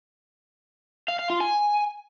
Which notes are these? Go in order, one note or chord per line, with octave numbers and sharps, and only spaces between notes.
F5
F5
F4
G#5